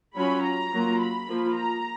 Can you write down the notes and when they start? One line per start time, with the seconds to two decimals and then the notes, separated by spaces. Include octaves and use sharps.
0.16 F#3 C#4 F4 B5
0.44 A#5
0.72 F#3 A#3 F4
1.01 B5
1.29 F3 A#3 F4
1.56 A#5